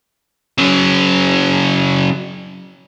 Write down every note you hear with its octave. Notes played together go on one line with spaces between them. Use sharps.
C#3 F#3